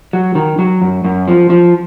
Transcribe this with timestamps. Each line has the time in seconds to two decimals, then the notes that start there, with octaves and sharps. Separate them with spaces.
0.13 F#3
0.35 D#3
0.59 F#3
0.82 F#2
1.04 F#2
1.28 F3
1.50 F3